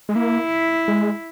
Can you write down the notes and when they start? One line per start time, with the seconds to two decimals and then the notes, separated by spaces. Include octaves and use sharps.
0.09 G#3
0.15 A#3 E4
0.88 G#3